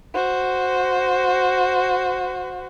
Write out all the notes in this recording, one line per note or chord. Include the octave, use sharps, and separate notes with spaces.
F#4 C5